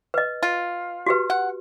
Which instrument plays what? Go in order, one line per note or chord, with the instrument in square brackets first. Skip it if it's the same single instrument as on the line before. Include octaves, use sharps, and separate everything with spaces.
[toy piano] B4 D#5
[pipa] F4
[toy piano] F#4 G4 B4
[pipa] F#5